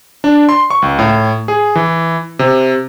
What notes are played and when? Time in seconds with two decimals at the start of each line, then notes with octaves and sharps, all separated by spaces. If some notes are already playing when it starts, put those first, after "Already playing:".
0.24 D4
0.49 C6
0.70 C#6
0.82 C#2
0.99 A2
1.48 G#4
1.75 E3
2.39 C3